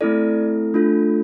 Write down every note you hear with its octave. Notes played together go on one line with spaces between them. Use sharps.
A3 C4 E4 A4 D5
A3 D4 F4 A4